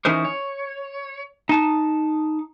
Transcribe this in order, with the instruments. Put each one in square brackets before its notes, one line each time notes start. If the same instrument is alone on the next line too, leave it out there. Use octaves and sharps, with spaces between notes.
[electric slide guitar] E3 C#4 D#4 A#4 C5
C#5
D#4 A5